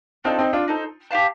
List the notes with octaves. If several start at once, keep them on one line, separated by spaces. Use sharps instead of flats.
C4 D4 D#4 F4 A4
C4 D#4
D4 F4
D#4 A4 C5
G4 D5 F5 A5